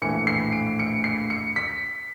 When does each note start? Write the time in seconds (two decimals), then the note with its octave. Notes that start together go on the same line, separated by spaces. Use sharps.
0.02 A#1 A2 E3 A3 C#7
0.27 C7
0.52 D7
0.79 C#7
1.04 C7
1.30 C#7
1.56 B6